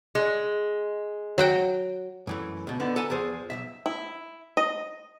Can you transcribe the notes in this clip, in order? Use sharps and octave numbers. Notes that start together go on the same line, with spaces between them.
G#3
F#3 F#4 G5
F#2 E3 A3
C#2 B2
D3 B3 D#4
A4 B4 G#5 A#5
E2 F3 G#4 C5
B1 A#2 E5
E4
D#5